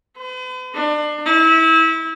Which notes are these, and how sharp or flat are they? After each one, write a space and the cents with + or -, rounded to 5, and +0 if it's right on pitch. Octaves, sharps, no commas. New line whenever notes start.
B4 +45
D4 +30
E4 -25